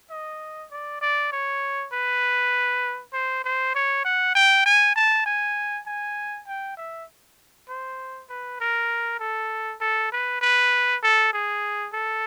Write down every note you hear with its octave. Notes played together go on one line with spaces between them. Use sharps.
D#5
D5
D5
C#5
B4
C5
C5
C#5
F#5
G5
G#5
A5
G#5
G#5
G5
E5
C5
B4
A#4
A4
A4
B4
B4
A4
G#4
A4